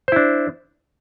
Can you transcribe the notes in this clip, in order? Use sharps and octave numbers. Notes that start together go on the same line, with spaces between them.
D4 E4 C5